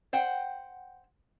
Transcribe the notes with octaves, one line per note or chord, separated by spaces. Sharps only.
C5 F#5 G5